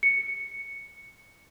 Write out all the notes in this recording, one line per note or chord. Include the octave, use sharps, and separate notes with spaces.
C#7